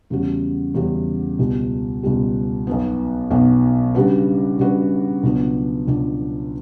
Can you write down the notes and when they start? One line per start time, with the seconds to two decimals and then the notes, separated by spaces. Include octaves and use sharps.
0.10 E2 C#3 G3 C#4 F#4
0.74 E2 C#3 G3 C#4 F#4
1.39 C#2 B2 G3
2.03 C#2 B2 G3
2.67 B1 B2 F#3 B3
3.30 B1 B2 F#3 B3
3.95 C#3 G3 D4 F#4 B4
4.59 C#3 G3 D4 F#4 B4
5.23 C#2 B2 F#3 B3 D4
5.87 C#2 B2 F#3 B3 D4